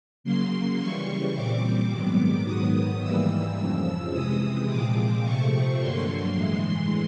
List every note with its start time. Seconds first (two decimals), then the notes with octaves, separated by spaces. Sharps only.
0.24 C#3 F#3 A#3 C6
0.79 C#3 E3 G3 C#6
1.35 A#2 G3 C4 D6
1.90 G#2 D#3 F#3 B3
2.46 G#2 D#3 F#3 B3 D#6
3.01 G#2 E3 G3 A#3 E6
3.57 F2 C#3 F3
4.12 C3 E3 G#3 D#6
4.68 A#2 F3 G#3 C4 D6
5.23 C3 F3 A3 C4 C#6
5.79 G2 D3 F#3 A#3 C6
6.34 A2 E3 G#3 C6